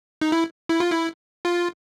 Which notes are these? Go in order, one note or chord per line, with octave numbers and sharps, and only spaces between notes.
D#4
E4
E4
F4
E4
F4